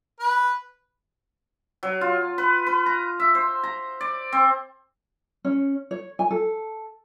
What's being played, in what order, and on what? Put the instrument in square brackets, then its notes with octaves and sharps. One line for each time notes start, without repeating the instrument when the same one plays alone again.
[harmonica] B4
[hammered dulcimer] F#3
F4
B4
B4
A#5
E5
C5
A#5
D5
C4
[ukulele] C#4
C#5
G#5
A4